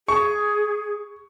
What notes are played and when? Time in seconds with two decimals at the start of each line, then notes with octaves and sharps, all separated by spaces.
0.08 G#4 C#6